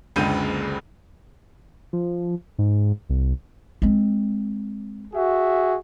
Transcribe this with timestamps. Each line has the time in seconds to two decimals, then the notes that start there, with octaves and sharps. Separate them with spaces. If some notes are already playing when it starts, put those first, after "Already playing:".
0.16 F#1 C#2 D3 G#3 G6 D#7
1.93 F3
2.59 G#2
3.10 C2
3.82 G#3 C4
5.14 F#4 G#4 E5